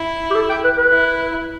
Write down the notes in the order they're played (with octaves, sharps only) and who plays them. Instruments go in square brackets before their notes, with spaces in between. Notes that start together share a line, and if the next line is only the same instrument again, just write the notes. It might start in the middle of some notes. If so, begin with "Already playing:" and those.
Already playing: [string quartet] E4
[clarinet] G4
A4
G5
B4
B4
[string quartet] E4